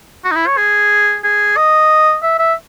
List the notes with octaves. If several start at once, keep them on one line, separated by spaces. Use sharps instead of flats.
F#4
D#4
E4
C#5
G#4
G#4
D#5
E5
E5